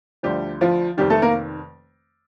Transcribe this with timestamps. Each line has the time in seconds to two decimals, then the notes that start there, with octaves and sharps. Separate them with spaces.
0.23 D2 D3 F3 G3 G4
0.61 F3 F4
0.97 F1 F2 D#3 G3 G4
1.10 A3 A4
1.22 A#3 A#4